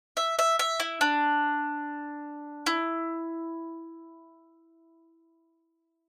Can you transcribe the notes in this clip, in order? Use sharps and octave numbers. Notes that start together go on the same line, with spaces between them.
E5
E5
E5
E4
D4
E4